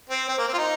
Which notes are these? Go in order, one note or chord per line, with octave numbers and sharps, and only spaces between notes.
C4
C4
A#3
C4
F4
D#4